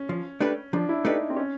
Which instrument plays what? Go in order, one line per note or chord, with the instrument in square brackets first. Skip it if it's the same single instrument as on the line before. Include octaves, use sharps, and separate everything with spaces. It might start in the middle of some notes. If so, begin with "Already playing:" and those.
Already playing: [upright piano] C#4
[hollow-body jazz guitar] F3
A3 D4 G4 B4
[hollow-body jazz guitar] F3 [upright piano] D4
[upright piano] E4
[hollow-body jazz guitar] A3 D4 G4 B4 [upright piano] D#4
[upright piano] C4
C#4